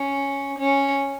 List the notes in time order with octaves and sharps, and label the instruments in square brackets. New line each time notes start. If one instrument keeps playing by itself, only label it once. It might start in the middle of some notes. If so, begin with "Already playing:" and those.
Already playing: [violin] C#4
C#4